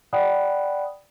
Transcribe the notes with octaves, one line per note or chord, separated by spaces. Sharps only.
D5 F#5 G5 B5 D#6 F#6